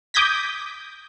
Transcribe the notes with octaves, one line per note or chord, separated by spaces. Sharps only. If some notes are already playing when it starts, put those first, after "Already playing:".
D6 D#6 G6 G#6 A#6 B6